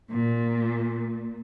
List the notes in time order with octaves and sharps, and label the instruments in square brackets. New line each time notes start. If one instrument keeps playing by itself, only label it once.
[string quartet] A#2